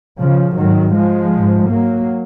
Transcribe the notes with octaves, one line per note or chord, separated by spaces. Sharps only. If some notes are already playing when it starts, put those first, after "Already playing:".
C#3 F3
G#2 D#3 F#3
F3 G#3
G#2
F#3 A#3